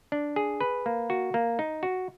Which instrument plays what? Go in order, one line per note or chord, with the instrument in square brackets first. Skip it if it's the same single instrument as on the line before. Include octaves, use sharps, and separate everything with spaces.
[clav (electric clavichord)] D4
G#4
B4
A#3
F#4
A#3
D#4
F#4